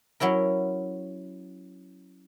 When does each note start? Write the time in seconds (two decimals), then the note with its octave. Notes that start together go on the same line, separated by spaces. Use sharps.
0.20 F#3 C#4 E4 A#4